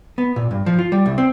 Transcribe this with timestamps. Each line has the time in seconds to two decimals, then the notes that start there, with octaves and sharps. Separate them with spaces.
0.18 B3
0.36 A#2
0.51 G2
0.66 F3
0.79 F4
0.92 G3
1.06 C2
1.18 C4